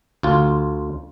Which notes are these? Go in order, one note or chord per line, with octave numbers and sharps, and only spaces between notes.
D2 F4